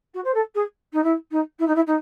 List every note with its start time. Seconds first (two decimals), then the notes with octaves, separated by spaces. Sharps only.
0.14 F#4
0.24 C5
0.34 A4
0.54 G#4
0.93 D#4
1.03 E4
1.31 D#4
1.59 E4
1.67 D#4
1.75 E4
1.87 D#4